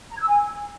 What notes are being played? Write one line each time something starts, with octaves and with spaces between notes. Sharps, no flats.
A#5
G#6
E6
G#5